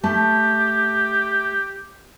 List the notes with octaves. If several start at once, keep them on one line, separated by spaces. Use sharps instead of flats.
A3 G4 A5